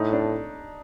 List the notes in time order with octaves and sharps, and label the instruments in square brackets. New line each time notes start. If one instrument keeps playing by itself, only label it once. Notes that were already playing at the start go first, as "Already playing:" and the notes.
Already playing: [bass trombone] A2 [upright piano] D#4
[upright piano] D4